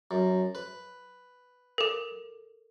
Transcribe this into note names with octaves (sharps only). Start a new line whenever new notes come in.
F#2
B4
A4 A#4